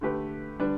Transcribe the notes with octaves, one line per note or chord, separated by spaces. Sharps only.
D3 A3 G4 B4
D3 G3 D4 B4